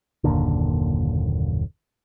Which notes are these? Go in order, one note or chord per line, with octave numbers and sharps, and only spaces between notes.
F#1 D#2 A#2 D3